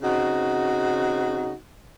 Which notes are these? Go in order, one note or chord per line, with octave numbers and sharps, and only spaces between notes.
C#3 C4 D#4 F#4